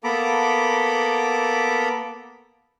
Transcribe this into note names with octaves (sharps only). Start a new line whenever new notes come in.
A#3 B3 A4 A#5 B5 D6